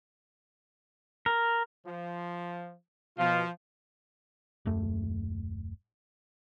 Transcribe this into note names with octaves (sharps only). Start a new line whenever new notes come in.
A#4
F3
B2 F3 F4
D#1 F#2 A3